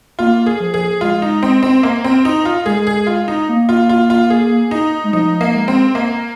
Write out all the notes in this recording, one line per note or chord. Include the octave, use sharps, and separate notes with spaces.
A#3 F4
G#4
F3
G#4
G#3 F4
D#4
C4
C4
A#3
C4
D#4
F4
G#3 G#4
G#4
F4
D#4
A#3
F4
F4
F4
G#4
D#4
G#3
F3 D#4
A#3
G#3
C4
A#3